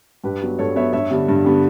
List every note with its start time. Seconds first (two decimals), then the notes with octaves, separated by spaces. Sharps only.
0.24 G2 G4 B4
0.41 F#3 B3
0.59 G2 A4 C#5
0.76 F#3 B3 C#5 E5
0.93 G2 C#5 E5
1.10 D3 G3 B3
1.28 G2
1.45 D3 G3 B3